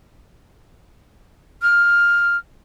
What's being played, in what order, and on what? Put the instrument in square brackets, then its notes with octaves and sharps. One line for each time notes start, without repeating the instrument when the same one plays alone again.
[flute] F6